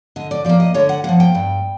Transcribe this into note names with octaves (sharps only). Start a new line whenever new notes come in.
D3 D#5
D5
F3 A#3 D5
D#5
D3 C#5
F#5
F3 A#3 F#5
G5
G2